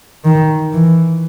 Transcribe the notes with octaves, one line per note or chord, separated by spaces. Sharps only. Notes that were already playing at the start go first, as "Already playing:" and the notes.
D#3
E3